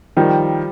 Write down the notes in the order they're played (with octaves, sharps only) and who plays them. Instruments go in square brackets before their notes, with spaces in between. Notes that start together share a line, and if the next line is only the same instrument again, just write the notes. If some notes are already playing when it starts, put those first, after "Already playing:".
[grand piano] D#3 [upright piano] F3 G3